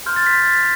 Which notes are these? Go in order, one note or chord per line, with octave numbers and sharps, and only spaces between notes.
C6 F6 G6
A6
B6